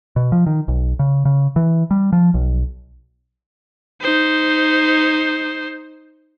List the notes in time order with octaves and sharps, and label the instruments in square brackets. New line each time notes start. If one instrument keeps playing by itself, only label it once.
[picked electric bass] B2
F3
D#3
B1
C#3
C#3
E3
G3
F3
B1
[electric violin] D#4 C5